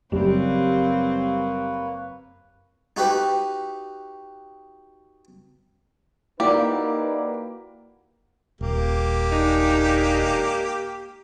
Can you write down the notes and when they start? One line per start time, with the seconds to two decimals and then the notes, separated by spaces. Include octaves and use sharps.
0.12 F#1 F#2 G3 A#3 C4 B4 C#5
2.96 D#4 F#4 G4 B4
6.40 A#3 D#4 E4 F#4 G4 B4 D5
8.61 D#1 A#3 G4
9.32 G#3 D4 D#4